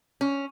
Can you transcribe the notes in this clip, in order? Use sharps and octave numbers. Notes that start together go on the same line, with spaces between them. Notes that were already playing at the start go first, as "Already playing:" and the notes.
C#4